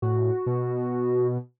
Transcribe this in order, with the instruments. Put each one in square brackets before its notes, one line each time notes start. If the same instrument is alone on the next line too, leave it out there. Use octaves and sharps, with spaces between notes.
[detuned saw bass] A2 [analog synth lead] F#4
[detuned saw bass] B2